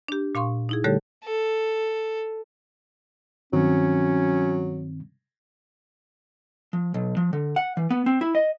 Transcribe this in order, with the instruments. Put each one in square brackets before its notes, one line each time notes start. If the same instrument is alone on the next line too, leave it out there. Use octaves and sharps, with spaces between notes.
[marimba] D4 G4
A#2 F5 C6 C#6
D#4 E4 G#4
D3 G3 A3 G4 A4 C#5
[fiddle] A4
[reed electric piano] G2 D#3 C4 [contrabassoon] F#3 [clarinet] C#4
[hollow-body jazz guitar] F3
B1
F3
D3
F#5
E3
B3
C4
E4
D#5